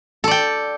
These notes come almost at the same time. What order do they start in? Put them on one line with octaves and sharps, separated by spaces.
A4 D5 G5